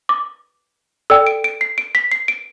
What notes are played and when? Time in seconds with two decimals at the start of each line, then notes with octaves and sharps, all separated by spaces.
0.09 D6
1.10 A4 D5 G5 E6
1.27 D7
1.44 D7
1.61 C7
1.78 D7
1.95 B6
2.12 C7
2.28 D7